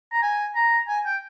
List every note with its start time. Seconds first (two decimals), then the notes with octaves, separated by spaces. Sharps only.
0.13 A#5
0.22 G#5
0.56 A#5
0.88 G#5
1.05 G5